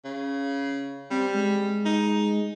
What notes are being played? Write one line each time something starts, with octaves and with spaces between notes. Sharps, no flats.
C#3
G3 C4
G#3
D#4